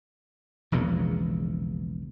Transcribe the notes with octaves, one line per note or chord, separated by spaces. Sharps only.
E1 A#1 E2 C#3